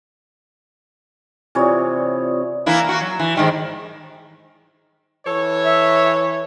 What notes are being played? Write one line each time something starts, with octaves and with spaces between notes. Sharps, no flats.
C3 E3 F4 C#5 D5 D#6
E3 A#3 E4
A#3 F#4
F#3
E3
G#2 D#3 G3
E3 A4 C#5
E5